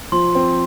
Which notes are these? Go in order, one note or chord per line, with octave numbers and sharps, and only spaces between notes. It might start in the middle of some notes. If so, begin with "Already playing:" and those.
F3 C6
C4